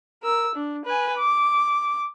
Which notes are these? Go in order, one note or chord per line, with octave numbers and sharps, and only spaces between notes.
A#4 E6
D4
B4 G#5
D6